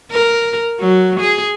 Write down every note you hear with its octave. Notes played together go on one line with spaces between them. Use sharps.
A#4
F#3
G#4